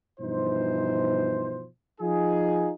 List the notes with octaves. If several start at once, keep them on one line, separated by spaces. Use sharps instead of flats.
G2 B2 E3 F3 D#4 C5
F3 D#4 F4 G#4